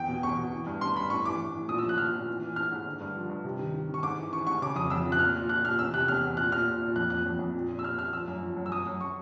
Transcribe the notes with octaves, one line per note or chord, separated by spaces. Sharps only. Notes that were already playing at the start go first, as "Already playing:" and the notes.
Already playing: E2 G5
B2
E2 C#6
B2
E3
G2
G2 C6
G2 B5
A2 C#6
E3 D6
E3
A2
A#2 D#6
E6
F3
F#6
F3 F6
A#2
E3
E3
E3 F6
G#2
D3
G2
F3
G2
C3
D#3
D#3
D#3
C#6
G#2 D6
E3
E3 C#6
G#2 C#6
C#3 D6
F2 D#6
F2 E6
F3
F#6
A#2 F6
A#2
A#2 F#6
A#2 F6
E2 E6
C3 F#6
E2 F6
E2
A#2 F#6
A#2 F6
A#2
A#2
F2 F#6
F2 F#6
F2
F2
A#2
A#2
E6
A#2 F6
A#2 F6
F3 E6
F#2
F3
F#2
E6
F#2 D#6
F#2
C#6